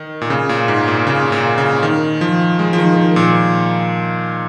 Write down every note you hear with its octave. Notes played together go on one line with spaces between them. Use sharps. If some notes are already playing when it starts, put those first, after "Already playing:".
Already playing: D#3
A#2
C#3
A#2
G#2
A#2
C#3
A#2
C#3
D#3
F3
G#3
F3
D#3
D#3
A#2